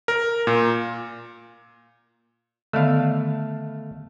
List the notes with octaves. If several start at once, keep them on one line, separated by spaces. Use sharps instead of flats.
A#4
A#2
D3 D#3 A3 B3 F5